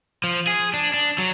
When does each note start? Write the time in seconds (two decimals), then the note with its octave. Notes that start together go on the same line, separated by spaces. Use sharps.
0.24 F3
0.47 G#4
0.74 D4
0.94 D4
1.18 F#3